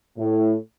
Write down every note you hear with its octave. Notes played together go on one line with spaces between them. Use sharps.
A2